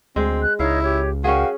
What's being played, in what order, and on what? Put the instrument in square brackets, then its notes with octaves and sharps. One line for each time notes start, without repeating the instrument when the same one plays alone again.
[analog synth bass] D2 [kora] G#3 [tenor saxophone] C4
[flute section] F#6
[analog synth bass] C#2 [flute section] D#4 C#5 [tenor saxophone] E4 [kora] F5
[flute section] G4 C#5
[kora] C#4 G#4 [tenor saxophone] F#4 [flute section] A#4 F5 G5